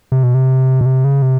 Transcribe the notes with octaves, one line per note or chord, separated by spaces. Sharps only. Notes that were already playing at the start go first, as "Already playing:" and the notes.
C3
B2
C3
B2
C3
C#3
C3